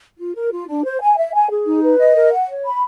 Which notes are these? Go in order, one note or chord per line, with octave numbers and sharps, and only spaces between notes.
F4
A#4
F4
D4
C5
G#5
E5
G#5
G#4
D#4
B4
D#5
A#4
F#5
C#5
B5